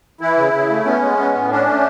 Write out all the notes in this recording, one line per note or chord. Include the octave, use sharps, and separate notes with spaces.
E3 E4
C#3
C#3
A3
B3 C#4
G#3
B3
A2
C#4 D4
A3